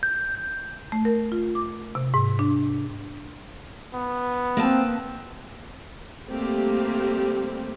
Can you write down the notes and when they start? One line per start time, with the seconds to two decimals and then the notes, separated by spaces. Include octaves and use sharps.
0.03 G6
0.92 A3
1.05 A#4
1.32 F4
1.55 D6
1.95 C3
2.14 G#2
2.39 D4
3.94 B3
4.57 A#3 C4 B4 A5
6.28 G3 A3 A#3 C4 G4